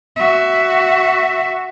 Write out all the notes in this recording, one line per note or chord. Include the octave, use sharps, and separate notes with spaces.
F#4 E5